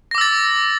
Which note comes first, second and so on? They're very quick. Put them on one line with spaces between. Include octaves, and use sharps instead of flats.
A#6 D6 E6 A6